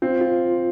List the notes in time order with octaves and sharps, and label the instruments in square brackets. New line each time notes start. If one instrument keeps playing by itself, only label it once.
[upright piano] C4 [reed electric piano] F4
[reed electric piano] F4